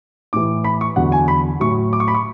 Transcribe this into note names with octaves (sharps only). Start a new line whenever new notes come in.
A2 E3 D6
B5
C#6
E2 D3 F#3 F#5
G#5
B5
A2 F#3 C#6
D6
C#6
B5
C#6